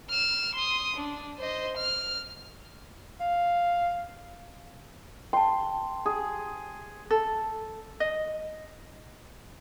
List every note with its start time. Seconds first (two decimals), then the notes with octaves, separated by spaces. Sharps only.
0.11 F6 E7
0.55 C6 D#6
0.96 D4
1.39 C5 D#5
1.77 F6
3.20 F5
5.33 G5 A5 C6
6.06 G#4
7.10 A4
8.00 D#5